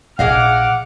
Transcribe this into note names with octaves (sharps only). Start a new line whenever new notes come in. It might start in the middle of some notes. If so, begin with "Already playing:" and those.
A#1 G#4 D#5 F5 F#5 D6 F6